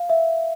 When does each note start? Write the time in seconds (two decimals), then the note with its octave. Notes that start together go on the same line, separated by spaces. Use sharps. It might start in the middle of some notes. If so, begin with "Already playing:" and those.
Already playing: F5
0.10 E5